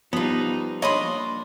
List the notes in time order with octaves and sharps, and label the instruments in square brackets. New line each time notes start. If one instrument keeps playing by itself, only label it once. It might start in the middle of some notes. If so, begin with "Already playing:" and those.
[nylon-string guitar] F3 [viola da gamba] G3 D#4 [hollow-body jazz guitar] B3 F4
[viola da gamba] A#3 D4 [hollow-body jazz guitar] C#5 [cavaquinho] D#5 B5 C6